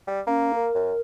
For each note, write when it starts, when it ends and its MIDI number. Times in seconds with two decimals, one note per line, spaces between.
0.07 0.21 55
0.27 0.68 58
0.27 0.51 61
0.53 1.00 70
0.75 0.92 42